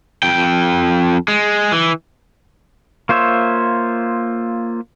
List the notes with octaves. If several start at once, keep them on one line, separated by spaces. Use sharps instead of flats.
F2 G5
G#3
E3
A#3 F4 C5 C#5 E5